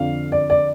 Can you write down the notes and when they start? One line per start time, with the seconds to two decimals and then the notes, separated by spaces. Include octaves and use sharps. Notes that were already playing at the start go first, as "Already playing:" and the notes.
Already playing: F2 D3 F5
0.32 D5
0.50 D5